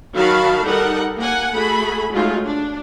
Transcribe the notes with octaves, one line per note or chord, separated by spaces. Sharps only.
D#3 F#3 F#4 F5 A5 B5
G3 D#4 A4 A#4 F#5
A#3 F#5 G#5
A3 F#4 G#4 A4 B5
F#3 G#3 A3 D#4 F4
D4